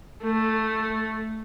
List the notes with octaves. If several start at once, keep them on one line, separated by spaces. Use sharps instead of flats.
A3